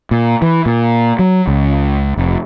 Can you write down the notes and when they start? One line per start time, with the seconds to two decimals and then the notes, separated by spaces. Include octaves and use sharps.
0.11 A#2
0.42 E3
0.66 A#2
1.19 F#3
1.47 C#2
2.17 F1